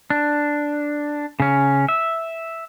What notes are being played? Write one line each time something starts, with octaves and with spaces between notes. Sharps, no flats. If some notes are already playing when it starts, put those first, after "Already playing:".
D4
C#3 C#4
E5